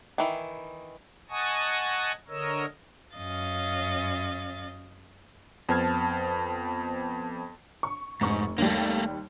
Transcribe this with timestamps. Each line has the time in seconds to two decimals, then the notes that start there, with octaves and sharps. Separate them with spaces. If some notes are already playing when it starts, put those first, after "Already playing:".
0.18 D#3 E3
1.30 D#5 F#5 G#5 A5 C#6 D#6
2.28 D3 A#4 C#5 D#5 E6
3.16 F#2 C#4 D#5 F5 A6
5.69 F2 B3 C5 A5 F6 G#6
7.83 C#6
8.21 F1 G#2 C#6
8.58 D#2 G3 A3 A#3